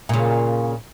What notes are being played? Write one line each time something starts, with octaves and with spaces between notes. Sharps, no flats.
A#2 C#3